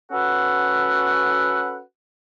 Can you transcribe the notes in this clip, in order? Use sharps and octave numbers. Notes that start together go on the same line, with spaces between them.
C#4 F#4 A4 B4 F#5